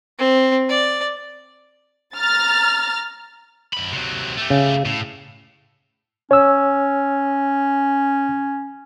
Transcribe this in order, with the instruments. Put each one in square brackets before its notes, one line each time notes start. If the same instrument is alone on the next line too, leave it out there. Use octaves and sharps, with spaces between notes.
[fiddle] C4
D5
[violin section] A#5 F6 A6
[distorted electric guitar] F#2 B5
C3 F#3
A3 G4
[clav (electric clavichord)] C#3
[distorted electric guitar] A2
[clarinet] C#4 [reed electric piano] C#5 E6